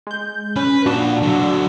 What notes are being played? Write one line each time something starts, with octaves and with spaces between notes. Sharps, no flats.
G#3 G6
C#4 B4
A#2 D4 F#4 A5
D3 F#3